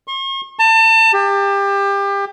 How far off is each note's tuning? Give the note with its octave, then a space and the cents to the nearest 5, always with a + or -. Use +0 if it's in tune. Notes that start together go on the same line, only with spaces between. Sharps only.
C#6 -45
A5 +30
G4 +25